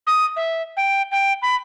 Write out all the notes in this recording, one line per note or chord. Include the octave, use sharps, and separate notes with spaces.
D#6
E5
G5
G5
B5